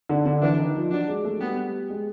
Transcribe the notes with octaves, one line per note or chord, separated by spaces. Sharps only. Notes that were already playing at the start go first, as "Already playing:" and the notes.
D3 D4
D3 D4
E3 D4 E4
D#3 D#4
F3 F4
F#3 D4 F#4
G#3 G#4
A3 A4
G3 B3 G4
G#3 G#4